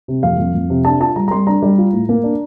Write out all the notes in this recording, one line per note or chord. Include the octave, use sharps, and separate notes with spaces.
C3
F2 F5
F2
F2
C3
D4 A5
F4 A5
G3 A#5
A#5
G3 C6
D4 A#5
G3
F4
A2
A#3
D4